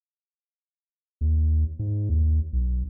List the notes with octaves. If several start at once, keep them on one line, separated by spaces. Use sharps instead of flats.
D#2
G#2
D#2
B1